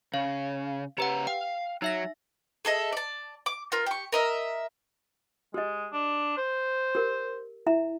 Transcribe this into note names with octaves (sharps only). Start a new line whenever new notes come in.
C#3 F5
C#3 G4 B4 F#5 A#5
F5 G5
F#3 D#4 E5 A#6
G#4 A4 D#5 E5
D5 A5
D6
F4 A#4
G4 C#6
A#4 D#5 E5
G#3 G4 D#5
D4
C5
G4 A#4
E4 E5 A#5